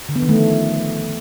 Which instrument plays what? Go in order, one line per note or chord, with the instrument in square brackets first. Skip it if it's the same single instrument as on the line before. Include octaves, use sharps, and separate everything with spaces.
[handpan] D3
B3
D#3
A3
F3